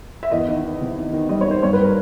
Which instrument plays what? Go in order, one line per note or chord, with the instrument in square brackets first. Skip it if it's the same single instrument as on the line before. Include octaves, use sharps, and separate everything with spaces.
[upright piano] E5
E2 D#5
D#3
D#3
C3
D#3
D#3
G3 D#5
C#5
D#3 C5
G2 C#5
B4
G3
A#4